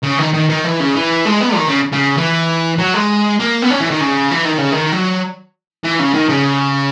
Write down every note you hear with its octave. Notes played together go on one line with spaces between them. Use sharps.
C#3
D#3
D#3
D#3
E3
C#3
E3
G#3
B3
D#3
C#3
C#3
E3
F#3
G#3
A#3
B3
C#4
E3
D#3
C#3
E3
D#3
C#3
D#3
F#3
E3
C#3
D#3
C#3